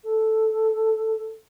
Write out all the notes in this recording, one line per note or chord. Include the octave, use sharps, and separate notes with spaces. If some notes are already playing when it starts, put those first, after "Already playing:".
A4